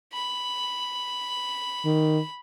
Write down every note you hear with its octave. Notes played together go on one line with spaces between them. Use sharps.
B5
D#3